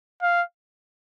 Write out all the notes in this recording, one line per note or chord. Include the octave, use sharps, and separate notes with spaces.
F5